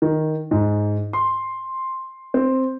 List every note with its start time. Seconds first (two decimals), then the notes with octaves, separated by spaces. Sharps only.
0.02 D#3
0.51 G#2
1.13 C6
2.34 C4